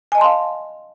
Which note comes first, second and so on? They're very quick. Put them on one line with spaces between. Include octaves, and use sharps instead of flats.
G#5 D#5 A5 C6 F5